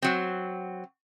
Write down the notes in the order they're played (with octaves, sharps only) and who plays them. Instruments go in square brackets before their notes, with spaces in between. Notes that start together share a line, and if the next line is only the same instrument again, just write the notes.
[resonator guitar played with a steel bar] F#3 C4